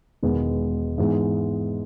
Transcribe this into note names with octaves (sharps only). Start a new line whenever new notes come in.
E1 E2 D#3 G#3 B3
G#2 E3 G#3 B3